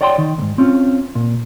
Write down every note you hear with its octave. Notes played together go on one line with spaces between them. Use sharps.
C#5 D5 F#5 G5 B5 C6
D#3
D2 G#2
C4 C#4 F4
A#2